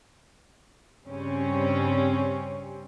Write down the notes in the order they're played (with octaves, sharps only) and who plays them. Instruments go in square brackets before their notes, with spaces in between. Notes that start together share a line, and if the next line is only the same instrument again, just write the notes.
[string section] G2 C#3 G3 C4 C#4